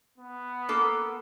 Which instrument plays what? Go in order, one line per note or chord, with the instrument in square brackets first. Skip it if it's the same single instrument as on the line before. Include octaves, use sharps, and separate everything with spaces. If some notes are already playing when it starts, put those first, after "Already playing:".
[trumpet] B3
[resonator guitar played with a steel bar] A#3 A4